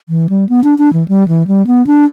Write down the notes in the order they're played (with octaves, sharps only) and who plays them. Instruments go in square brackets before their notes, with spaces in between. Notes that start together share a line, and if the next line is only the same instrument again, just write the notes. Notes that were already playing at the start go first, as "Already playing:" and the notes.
[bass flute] E3
G3
B3
D4
D4
E3
G3
E3
G3
B3
D4